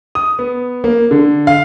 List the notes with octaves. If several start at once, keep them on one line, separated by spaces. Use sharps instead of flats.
D#6
B3
A#3
D3
F5